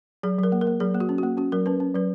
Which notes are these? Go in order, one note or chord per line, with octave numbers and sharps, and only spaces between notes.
F#3 G#4
F#3 A#4
A#3
A#4
A#3
F#3 G#4
A#3
F#4
C#4
F#4
A#3
C#4 F#4
F#3 A#4
C#4 B4
C#4
F#3 B4